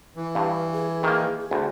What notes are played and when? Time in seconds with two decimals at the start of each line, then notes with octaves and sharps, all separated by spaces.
0.16 E3
0.35 G2 F5
0.74 G#4
1.03 D#3 A#3
1.39 G#4
1.51 D2